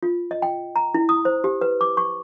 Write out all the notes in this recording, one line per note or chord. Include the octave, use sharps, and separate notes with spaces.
F4
D#5
G5
A#5
E4
D#6
C5
G4
B4
D6
C#6